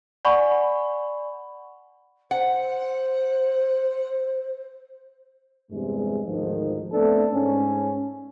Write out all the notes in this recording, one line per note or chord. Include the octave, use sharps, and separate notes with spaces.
D5 F#5 G#5 B5 C#6
C5 F#5
E2 G2 C3 G#3
D2 G#2 D#3 F3
A3 B3 C4 D4 A4
G#2 C#4